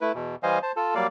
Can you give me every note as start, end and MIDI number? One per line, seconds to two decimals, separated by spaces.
0.01 0.12 57
0.01 0.12 64
0.01 0.12 71
0.14 0.35 40
0.14 0.35 47
0.43 0.59 52
0.43 0.59 55
0.43 0.59 72
0.43 0.59 75
0.43 0.59 77
0.43 0.59 80
0.62 0.72 72
0.62 0.72 81
0.76 0.95 65
0.76 0.95 69
0.76 0.95 81
0.95 1.07 54
0.95 1.07 55
0.95 1.07 58
0.95 1.07 74
0.95 1.07 77